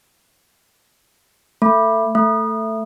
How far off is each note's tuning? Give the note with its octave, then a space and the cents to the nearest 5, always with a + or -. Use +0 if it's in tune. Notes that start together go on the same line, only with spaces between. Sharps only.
A3 +20
A3 +10